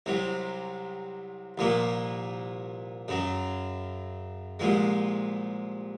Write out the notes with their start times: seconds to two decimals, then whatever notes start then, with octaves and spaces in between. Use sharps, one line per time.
0.06 C2 C3 F#3
1.58 C2 A#2 F3 A#3
3.08 F#2 C#3 F#3
4.60 C2 A#2 F3 G#3